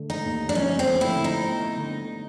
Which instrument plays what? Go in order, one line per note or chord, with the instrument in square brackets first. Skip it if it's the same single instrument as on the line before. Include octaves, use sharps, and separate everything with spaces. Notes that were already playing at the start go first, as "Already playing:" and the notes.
Already playing: [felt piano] D3 A3
[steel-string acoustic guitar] D#4
[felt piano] D#2
[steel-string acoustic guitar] D4
[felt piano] F3 [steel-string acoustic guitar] C#4
[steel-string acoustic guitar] C4
[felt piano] A3
[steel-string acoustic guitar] E4
[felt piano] D3
[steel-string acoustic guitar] D#4
[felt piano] B3
D3